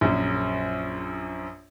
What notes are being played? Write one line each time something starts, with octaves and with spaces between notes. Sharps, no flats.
A#1 F#2